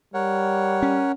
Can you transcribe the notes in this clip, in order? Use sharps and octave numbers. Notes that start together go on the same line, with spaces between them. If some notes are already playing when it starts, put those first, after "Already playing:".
G3 A#4 C#5 F#5
C#4